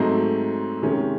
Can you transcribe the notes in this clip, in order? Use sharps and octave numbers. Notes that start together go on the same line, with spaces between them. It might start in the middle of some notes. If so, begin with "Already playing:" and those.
Already playing: G#2 F#3 A3 C4 D#4
C3 D#3 G#3 C#4